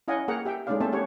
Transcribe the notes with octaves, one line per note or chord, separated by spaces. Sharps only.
C#4 E4 D#5 F5 F#5 G#5
A#3 G#4 A#4 F#5 G5 A#5
G4 E5 G5
G#3 A3 C#4 D#4 D5 F5
A#3 C4 A4 C5 E5 A5
A3 A#3 C#4 G4 C#5 F#5